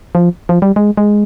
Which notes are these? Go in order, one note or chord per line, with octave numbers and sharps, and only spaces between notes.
F3
F3
G3
G#3
G#3